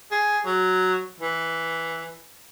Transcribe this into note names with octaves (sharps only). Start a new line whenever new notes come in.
G#4
F#3
E3